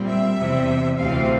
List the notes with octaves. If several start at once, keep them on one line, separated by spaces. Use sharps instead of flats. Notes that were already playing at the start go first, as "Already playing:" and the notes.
Already playing: A#2 G3 C4
E5
E2 C3 G3
D2 C3 E3 A3 C4 F5